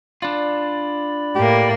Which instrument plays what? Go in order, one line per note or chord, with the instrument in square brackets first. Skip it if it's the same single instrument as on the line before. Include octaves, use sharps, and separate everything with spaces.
[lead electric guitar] D4 F4 [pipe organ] D5 B5
[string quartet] A2 A#3 [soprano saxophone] G4